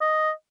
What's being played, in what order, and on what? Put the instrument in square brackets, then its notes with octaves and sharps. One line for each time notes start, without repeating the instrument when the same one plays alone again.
[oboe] D#5